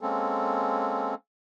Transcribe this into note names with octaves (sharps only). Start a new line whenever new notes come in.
G#3 A#3 C4 C#4 A4